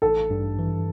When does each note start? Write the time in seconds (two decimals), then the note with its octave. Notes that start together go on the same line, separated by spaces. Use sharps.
0.02 A1 A4
0.30 G2
0.59 E3